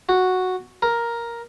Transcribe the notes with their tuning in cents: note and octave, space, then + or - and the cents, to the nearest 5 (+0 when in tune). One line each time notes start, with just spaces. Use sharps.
F#4 -5
A#4 +5